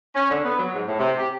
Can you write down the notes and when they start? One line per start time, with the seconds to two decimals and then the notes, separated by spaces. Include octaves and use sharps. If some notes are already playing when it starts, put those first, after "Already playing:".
0.14 C#4
0.30 D3
0.44 B3
0.59 F#3
0.74 G#2
0.87 A2
0.99 C3
1.18 G4